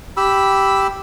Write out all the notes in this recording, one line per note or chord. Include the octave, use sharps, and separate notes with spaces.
G4 B5 E6